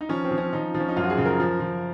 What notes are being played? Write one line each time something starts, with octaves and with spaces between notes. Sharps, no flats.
D#4
F3 C#4
C4
F3
C#4
F3 D#4
F3
C#4
D#4
F#2 F4
F#4
G#4
C#3
A#4
F3
F3